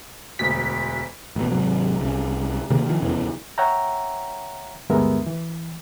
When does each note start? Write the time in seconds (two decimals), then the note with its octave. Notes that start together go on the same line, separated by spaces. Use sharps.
0.39 E1 D2 B6
1.36 A1 B2
1.51 G#1 C3 F#3
2.01 C2 C#3
2.70 C3 D#3 A#3 C4
2.86 D#3 F3
3.01 F1 E2 C#3 E3
3.58 C#5 E5 F#5 G5 A#5
4.89 D2 G2 G#3 B3 A#4 E5
5.26 E3